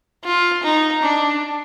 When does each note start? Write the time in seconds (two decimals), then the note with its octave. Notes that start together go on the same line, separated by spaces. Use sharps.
0.24 F4
0.63 D#4
1.03 D4